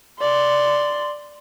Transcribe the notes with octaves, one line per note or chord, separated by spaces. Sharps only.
D5 C6